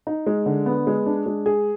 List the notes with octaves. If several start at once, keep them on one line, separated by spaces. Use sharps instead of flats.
D#4
G#3
D3
B3
G#3
D4
G#3
G#4